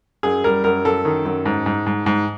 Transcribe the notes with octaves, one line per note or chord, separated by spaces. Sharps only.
F#2 G#4
G3 A#4
F#2 A#4
F#2 A4
D#3
F#2
G#2
G#2
G#2
G#2